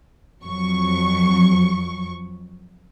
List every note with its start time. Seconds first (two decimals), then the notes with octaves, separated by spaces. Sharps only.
0.43 F2 F#3 C#6